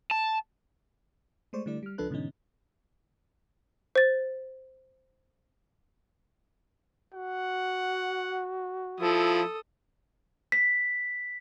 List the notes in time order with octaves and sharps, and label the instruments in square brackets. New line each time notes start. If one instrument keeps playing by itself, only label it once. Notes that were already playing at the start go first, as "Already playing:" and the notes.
[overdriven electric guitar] A5
[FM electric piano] G#3 A3 C5 D5 C#6
D3 G3 A3 E4 D5
G3 F6
C#2 F3 D4 A4 B4 F#6
G#2 B2 D3 E3 C#4 D#4
[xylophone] C5 A6
[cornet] F#4 [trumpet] F#5
[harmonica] F3 [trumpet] E4 [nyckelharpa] A4 D#6
[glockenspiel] B6